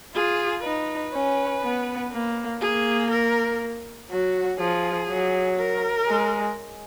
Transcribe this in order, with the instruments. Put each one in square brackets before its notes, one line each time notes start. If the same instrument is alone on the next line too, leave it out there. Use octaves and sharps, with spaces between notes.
[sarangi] F4 [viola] G#4
[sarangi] D#4 [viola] B4
[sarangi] C#4
B3
A#3
[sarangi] A#3 [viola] G#4
[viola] A#4
[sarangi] F#3 [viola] F#4
[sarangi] F3 [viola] G#4
[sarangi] F#3
[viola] A#4
[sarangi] G#3